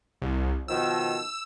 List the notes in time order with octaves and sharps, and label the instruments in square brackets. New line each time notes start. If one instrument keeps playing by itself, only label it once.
[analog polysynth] C2
[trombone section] B2 D#3 F3 [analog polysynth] E6